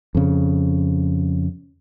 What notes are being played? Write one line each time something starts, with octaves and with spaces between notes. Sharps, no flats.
F2 C#3